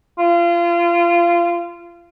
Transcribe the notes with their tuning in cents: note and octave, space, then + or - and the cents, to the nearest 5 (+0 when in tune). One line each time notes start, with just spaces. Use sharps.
F4 -25